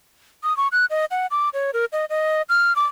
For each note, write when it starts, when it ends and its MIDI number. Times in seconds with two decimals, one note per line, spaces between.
0.43 0.56 87
0.57 0.68 85
0.72 0.85 90
0.90 1.05 75
1.11 1.27 78
1.31 1.49 86
1.54 1.71 73
1.74 1.85 70
1.92 2.05 75
2.10 2.42 75
2.49 2.75 89
2.76 2.85 86